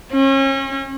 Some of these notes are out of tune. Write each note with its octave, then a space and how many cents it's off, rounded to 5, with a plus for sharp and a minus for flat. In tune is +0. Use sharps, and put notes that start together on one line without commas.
C#4 -35